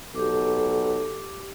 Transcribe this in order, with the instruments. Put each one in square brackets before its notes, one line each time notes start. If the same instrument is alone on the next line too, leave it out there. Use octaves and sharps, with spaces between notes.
[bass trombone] B1 [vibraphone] G4 D6 [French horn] A4